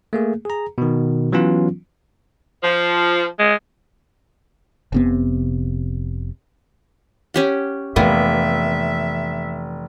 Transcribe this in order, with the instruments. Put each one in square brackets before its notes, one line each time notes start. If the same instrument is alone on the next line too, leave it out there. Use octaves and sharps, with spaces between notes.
[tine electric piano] A3 A#3 G#4
G#4 A#5
B2 D#3
E3 F#3 B3 C#4 F4
[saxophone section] F3
[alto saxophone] G#3
[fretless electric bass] F1 C3 B3
[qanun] C#4 G4 F#5
[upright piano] F1 [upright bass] E3 [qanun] A#3 B3 [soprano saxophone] E5